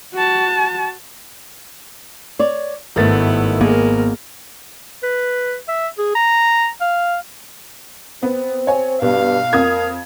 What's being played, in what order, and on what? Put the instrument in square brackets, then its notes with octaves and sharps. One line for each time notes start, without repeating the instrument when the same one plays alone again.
[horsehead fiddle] F#4 A5
[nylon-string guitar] C#5 D5
[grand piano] G#1 A6 [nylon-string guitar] G2 D#3 A3 [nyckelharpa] B3 E4
[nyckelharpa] G#3 A#4 [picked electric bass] A#3 B3
[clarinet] B4
E5
G#4
A#5
F5
[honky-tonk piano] B3 [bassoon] C4
[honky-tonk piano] C#5 G#5
[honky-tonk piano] B1 [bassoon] G2 [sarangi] F5
[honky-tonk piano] F2 D#6 G#6 [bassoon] A#3